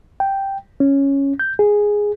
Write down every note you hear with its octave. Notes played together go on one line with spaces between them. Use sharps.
G5
C#4
G6
G#4